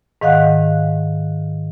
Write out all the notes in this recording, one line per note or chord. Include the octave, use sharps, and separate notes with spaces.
G#2 D#3 D#5 F5 F#5 F#6